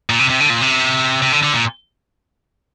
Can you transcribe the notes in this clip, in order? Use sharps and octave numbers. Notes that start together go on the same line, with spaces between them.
A#2
C3
C3
D3
A#2
C3
C3
D3
D3
A#2